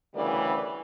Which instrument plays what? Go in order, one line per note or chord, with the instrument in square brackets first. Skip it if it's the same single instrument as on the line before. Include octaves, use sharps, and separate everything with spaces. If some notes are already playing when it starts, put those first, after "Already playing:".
[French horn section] D2 C#3 E3 G3 A#4 D5